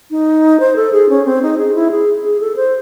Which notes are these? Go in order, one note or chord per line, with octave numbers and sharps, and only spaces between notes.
D#4
C5
A4
G#4
C#4
C4
D#4
G#4
E4
G#4
G#4
A4
C5